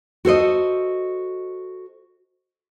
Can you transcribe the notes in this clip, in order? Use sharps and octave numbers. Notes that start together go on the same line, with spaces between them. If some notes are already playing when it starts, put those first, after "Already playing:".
F#4 A4 C5 D#5